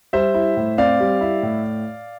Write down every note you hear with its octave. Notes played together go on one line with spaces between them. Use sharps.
G3 C5 E5
E4
A2
C4 D5 F5
G3
E4
A2